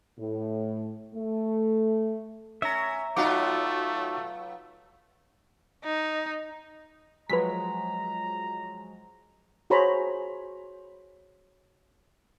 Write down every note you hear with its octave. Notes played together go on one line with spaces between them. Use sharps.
A2
A3
C#4 E5 A#5
F#3 A3 B3 D#4 F4 F#4 D6
D#4
F3 F#3 G#3 B4 A#5 B6
F#4 G#4 C5 C#5 A#5 B5